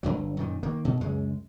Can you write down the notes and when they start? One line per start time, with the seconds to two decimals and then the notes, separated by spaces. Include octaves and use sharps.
0.03 G1 E2 G2 F#3
0.37 F#2 A#2 D#3
0.63 D#3 A#3
0.85 B2
1.01 C#2 F#2 G#3